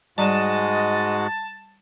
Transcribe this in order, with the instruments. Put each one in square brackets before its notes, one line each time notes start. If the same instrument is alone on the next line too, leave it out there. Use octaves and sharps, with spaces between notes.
[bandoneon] G#2 G#3 F#4 [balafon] G3 D5 A#5 [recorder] D#5 [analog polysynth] A5